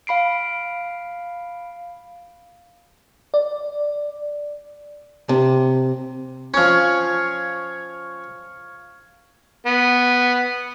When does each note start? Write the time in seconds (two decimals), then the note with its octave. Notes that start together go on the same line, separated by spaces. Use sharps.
0.07 F5 B5 C7 D7
3.34 D5
5.29 C3
6.54 F3 C#4 C#5 F5
9.66 B3